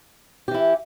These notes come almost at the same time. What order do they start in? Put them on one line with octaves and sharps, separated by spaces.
G4 E3 E4